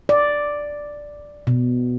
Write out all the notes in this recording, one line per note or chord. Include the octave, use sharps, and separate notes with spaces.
D5
B2